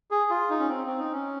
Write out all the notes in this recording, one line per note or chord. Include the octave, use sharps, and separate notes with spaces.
G#4
F4
D#4
C#4
C4
C4
D#4
C#4